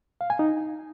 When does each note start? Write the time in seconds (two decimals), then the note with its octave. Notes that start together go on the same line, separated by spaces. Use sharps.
0.21 F5
0.30 G#5
0.39 D#4